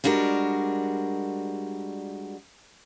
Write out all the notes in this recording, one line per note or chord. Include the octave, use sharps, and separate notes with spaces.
G3 G#3 D4 F#4 A#4